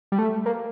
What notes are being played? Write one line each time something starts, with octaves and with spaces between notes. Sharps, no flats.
G3
A3
A#3